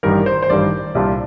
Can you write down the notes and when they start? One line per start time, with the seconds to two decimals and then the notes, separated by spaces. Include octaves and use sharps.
0.03 A1 G2 D#3 G3 A#4
0.26 C5
0.42 C5
0.50 A1 G2 D#3 G3 D5
0.95 C2 A#2 G3 D4 F4